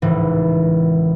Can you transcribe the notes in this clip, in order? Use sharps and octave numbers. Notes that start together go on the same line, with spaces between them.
G#1 C#2 A2 E3